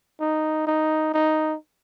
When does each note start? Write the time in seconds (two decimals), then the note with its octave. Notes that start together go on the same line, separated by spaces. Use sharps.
0.20 D#4
0.67 D#4
1.14 D#4